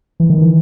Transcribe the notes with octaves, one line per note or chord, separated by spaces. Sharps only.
E3
D#3
E3